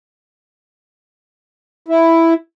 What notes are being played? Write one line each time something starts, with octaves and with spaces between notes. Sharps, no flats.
E4